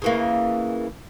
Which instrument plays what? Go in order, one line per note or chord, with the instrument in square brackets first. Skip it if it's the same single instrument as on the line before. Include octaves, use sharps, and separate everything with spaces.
[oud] C#3 E3 A#3